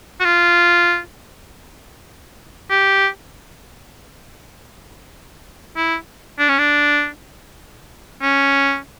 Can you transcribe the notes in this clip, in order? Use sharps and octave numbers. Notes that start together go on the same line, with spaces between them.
F#4
F4
G4
E4
D4
C#4
D4
C#4